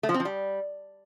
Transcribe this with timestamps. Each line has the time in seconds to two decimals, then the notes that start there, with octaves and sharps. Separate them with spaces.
0.03 A3
0.09 F3
0.14 C4
0.20 F3
0.25 G3